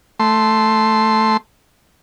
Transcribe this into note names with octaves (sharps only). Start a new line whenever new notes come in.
A3 C6